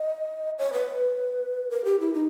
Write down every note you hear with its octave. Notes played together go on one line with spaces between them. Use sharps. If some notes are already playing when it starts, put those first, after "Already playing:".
Already playing: D#5
C#5
B4
A#4
G4
E4
D#4